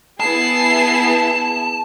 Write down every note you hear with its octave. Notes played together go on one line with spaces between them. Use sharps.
B3 E4 G#4 A5 C7